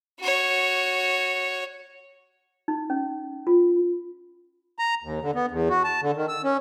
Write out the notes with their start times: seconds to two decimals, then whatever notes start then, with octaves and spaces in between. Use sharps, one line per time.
0.19 F#4 C#5
2.68 D#4
2.90 C#4
3.47 F4
4.79 A#5
5.04 D#2
5.22 D3
5.35 B3
5.51 E2
5.70 F#4
5.84 A5
6.02 D3
6.16 D#3
6.28 E6
6.44 C#4